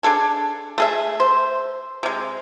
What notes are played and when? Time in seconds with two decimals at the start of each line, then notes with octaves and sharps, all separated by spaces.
0.03 D4 G#4 A4 G#5
0.78 A3 G#4 E5
1.20 C5
2.03 C3 G#3